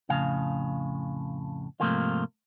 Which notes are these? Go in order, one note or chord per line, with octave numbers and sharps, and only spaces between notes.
F2 A2 C#3 F5
G#2 C3 F3 A3 A#3 F4